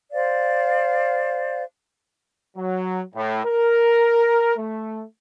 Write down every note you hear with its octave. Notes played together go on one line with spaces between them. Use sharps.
C5 D5 F5
F#3
A2
A#4
A3